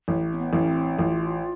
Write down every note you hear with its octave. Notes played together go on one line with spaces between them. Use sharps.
A1
C4
B3
A1
C#4
C4
A1 F4